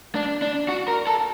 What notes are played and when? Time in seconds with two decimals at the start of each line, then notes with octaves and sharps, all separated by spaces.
0.15 D4
0.42 D4
0.68 F#4
0.88 A#4
1.07 A4